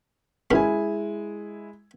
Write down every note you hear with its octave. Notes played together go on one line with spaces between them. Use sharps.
B2 D#3 G#3 C#4 E4 G#5